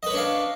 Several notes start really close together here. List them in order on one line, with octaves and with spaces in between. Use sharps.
D#5 B4 C#5 D4 F5